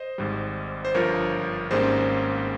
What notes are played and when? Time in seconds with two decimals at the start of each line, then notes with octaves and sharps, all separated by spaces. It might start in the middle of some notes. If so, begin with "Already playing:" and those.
Already playing: C5 D#5
0.18 G#1 G#2 G3
0.85 C5
0.94 G1 G2 F3 A#4 C#5
1.71 G#1 G#2 G3 A#3 C#4 G#4 C5